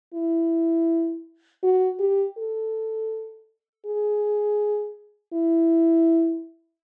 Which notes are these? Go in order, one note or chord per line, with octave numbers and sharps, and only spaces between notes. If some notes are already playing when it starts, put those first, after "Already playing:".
E4
F#4
G4
A4
G#4
E4